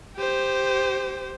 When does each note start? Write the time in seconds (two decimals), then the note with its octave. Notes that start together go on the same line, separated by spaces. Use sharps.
0.17 G4 C5